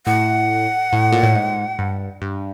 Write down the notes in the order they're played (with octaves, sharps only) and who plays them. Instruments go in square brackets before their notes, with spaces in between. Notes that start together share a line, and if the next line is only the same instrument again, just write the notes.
[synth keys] A2 [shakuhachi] F#5
[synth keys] A2
A#2
A2
G#2
G2
G2